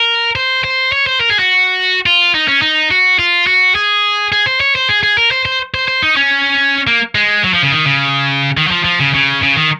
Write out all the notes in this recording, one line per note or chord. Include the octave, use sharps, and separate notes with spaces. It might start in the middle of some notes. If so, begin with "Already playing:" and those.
Already playing: A#4
C5
C5
C#5
C5
A#4
G#4
F#4
F4
D#4
C#4
D#4
F#4
F4
F#4
G#4
G#4
C5
C#5
C5
G#4
G#4
A#4
C5
C5
C5
C5
D#4
C#4
A#3
G#3
F#3
F3
C#3
D#3
C#3
D#3
F#3
F3
F3
C#3
C#3
C#3
D#3